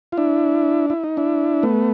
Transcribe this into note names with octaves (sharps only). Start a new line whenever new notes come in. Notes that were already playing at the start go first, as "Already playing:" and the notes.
F4
D4 E4
E4
D#4
D4 E4
A3 B3